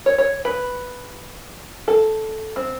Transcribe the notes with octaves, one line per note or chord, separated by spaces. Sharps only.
C#5
C#5
B4
A4
C4